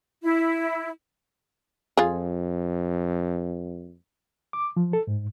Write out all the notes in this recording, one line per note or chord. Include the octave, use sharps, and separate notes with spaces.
E4
F2 F4 G#4
D6
F3
A4
G#2